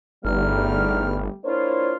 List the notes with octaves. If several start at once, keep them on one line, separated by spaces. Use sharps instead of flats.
G1 E2 G3 A3 B3 D#4 F6
A#3 D4 E4 F4 C5 C#5